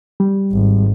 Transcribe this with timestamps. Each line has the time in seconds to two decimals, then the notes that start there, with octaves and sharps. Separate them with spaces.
0.20 G3
0.52 G#1